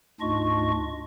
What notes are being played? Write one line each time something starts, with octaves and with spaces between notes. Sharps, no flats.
D2 G#2 D4 F4 D#5 C#6